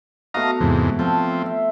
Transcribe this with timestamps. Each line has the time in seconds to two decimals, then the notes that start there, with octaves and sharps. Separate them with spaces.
0.34 A3 B3 F#4 D#5 F5 A#5
0.61 E2 G#2 C3
0.99 F3 C4 A4 G5
1.46 E5